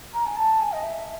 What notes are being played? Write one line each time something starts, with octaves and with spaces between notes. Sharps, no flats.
A#5
G#5
A5
G#5
D#5
E5